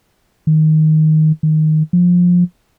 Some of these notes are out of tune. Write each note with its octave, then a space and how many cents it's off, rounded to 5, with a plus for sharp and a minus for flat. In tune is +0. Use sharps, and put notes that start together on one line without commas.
D#3 +5
D#3 +0
F3 +20